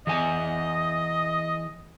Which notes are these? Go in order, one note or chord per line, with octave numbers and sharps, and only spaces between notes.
E3 G#4 D#5 G#5